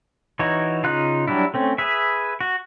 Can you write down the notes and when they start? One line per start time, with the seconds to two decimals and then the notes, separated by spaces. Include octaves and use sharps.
0.39 E3 D#4 F#4 C#5
0.84 C#3 D#4 F4 F5 F#6
1.28 F#3 G3 D4 E4
1.54 A3 C4 C#4
1.78 G#4 B4 E5
2.41 F#4